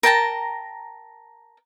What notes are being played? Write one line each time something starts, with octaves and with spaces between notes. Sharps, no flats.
A#4 G5 A5 A#5